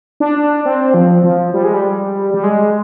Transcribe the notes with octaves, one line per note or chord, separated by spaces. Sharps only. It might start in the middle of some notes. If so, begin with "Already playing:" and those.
D4
C4
F3
F3
G3
G#3
G3
G3
G#3